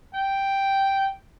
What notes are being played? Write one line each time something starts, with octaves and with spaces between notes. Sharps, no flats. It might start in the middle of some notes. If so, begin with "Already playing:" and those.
G5